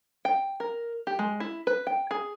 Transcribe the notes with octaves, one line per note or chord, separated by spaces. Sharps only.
G5
A#4
G4
G#3
E4
B4
G5
G#4